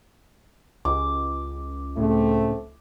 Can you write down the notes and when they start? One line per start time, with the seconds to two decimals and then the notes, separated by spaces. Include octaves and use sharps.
0.85 C#2 D6
1.97 A2 C#3 A3 C4